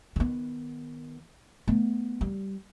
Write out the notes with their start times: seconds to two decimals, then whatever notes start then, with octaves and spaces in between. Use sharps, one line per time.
0.16 D#3 B3
1.68 A3 B3
2.21 G3